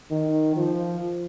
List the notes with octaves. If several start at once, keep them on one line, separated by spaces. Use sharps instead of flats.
D#3
F3